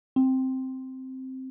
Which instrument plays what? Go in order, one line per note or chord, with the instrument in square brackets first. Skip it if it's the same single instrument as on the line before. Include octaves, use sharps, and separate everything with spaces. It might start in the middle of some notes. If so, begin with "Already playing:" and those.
[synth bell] C4